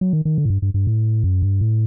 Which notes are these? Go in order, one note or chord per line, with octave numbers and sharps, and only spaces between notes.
F#3
D#3
D#3
D3
A2
G2
G2
G2
A2
F#2
G2
A2